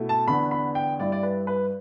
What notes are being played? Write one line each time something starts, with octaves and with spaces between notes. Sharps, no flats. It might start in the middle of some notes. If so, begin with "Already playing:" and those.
Already playing: B2 A3 E4
A5
E2 D3 B3 D4 B5
B5
G5
G2 G3 E4 D5
D5
B4
B4